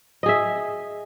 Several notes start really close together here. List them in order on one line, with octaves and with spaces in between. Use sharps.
D#5 G#4 E5